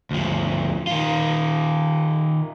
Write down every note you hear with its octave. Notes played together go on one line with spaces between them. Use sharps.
D2 F3
D#3 F4